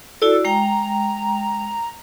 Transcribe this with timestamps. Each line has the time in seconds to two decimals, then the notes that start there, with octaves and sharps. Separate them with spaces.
0.22 E4 F#4 A4 D5
0.45 G#3 G5 A#5